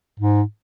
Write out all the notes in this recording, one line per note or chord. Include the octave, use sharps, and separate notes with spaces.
G#2